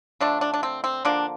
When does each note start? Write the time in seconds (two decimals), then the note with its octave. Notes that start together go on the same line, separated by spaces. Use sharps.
0.20 D3 F3 A3 D4
0.41 D4
0.54 D4
0.63 C4
0.84 C4
1.05 D3 F3 A#3 D4